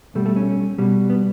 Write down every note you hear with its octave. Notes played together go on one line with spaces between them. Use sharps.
B2 G3 A3
A3
C#4
B2 G3
B3